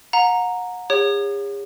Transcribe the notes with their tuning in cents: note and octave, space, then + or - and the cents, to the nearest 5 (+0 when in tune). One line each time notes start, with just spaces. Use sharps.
F#5 -35 A#5 +0
G#4 -45 C#5 +0